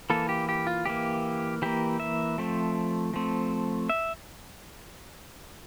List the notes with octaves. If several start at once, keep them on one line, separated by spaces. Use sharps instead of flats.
E3 A#3 A4
G4
G4
F4
E3 A#3 G4
E3 A#3 G4
E5
F3 A3 C4
F3 A3 C4
E5